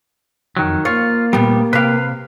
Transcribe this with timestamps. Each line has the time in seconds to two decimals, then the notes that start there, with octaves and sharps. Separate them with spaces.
0.57 F2 D#3 F#3
0.85 A#3 F4 C#5
1.33 D2 A#2 G3 B3
1.73 C3 G4 B4 F5